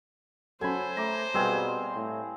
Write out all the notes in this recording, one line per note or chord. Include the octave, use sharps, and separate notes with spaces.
F#3 C#4 A4 C5 G#5 B5
A3 A#5 D6
B2 G3 C4 G#4 B4 F5
A2